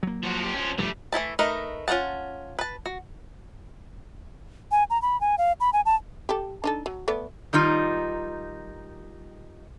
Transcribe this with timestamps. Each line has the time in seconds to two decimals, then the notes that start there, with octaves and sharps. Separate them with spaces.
0.03 F#3 A#3
0.23 F3 F#4
0.38 F3 G4
0.54 F3 C#4
0.78 F1 G2 F3 G3 A3
1.12 E3 A3 E4 A5
1.39 A3 D#4 A#4 B4 D#5
1.88 C#4 F4 C#5 F#5 A5
2.59 B4 A5
2.86 F#4
4.71 G#5
4.90 A#5
5.02 B5
5.21 G#5
5.38 F5
5.60 B5
5.73 G#5
5.85 A5
6.29 G4 A4
6.64 D4 D#4 A4
6.86 F#3
7.08 A3 B3 D5
7.53 D#3 G3 D#4 F4